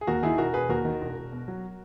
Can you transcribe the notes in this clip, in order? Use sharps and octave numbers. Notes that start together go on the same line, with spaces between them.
G#4
D#2 F#4 A#4
D#3 E4 G#4
E1 F#4 A#4
E1 G#4 B4
D#2 F#4 A#4
D#3
E1
E1
B2
F#3